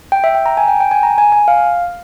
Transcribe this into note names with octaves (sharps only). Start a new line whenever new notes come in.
G5
E5
G5
A#5
G#5
G5
G5
G#5
A#5
G#5
G#5
F5